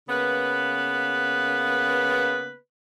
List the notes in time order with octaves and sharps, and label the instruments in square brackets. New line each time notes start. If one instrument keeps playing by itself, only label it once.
[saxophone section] C#3 A#3 B3 B4